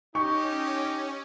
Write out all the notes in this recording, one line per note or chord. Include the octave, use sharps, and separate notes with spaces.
C#4 D#4 G4 C#6